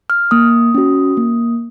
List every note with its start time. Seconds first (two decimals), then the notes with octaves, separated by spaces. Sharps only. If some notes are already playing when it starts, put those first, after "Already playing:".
0.10 F6
0.31 A#3 D#6
0.75 C#4 F#4
1.17 A#3